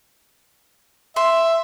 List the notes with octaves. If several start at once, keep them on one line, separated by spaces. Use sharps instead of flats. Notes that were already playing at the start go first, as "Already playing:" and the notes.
E5 C6